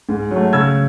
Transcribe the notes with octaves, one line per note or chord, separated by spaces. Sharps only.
G#2
F#3
A3
C#3 E6 G#6